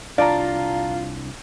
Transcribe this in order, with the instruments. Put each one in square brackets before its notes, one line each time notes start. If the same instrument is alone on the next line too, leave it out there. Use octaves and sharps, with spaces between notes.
[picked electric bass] C2 D4 [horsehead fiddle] F4 [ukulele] D5 [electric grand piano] F5 A5 A#5